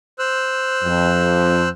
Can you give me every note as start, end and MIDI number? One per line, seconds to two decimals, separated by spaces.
0.19 1.69 72
0.19 1.69 88
0.19 1.69 90
0.84 1.68 41